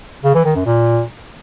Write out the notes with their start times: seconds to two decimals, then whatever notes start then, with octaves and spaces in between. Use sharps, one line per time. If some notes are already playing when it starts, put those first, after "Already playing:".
0.24 C#3
0.34 E3
0.45 D#3
0.55 F#2
0.66 A#2